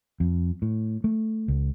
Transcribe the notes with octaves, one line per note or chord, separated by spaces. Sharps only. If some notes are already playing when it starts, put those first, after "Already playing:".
F2
A2
A3
C#2